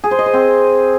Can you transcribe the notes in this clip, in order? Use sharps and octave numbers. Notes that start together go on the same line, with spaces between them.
G#4
C5
D#5
C5
C4